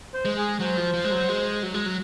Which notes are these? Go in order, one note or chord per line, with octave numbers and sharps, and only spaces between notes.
C5
G#3
G#4
F#3 C5
F3
F3
G#3
F#3
G#3
F#3
G#3
F#3